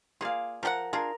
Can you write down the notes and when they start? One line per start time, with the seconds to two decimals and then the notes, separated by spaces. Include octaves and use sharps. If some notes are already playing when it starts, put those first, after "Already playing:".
0.21 A#3 F4 G#4 D5 F5
0.63 F3 G4 A#4 F#5
0.93 D4 F4 G#4 A#4